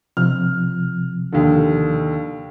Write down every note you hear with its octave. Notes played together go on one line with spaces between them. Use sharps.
C3 F3 F6
D#2 D3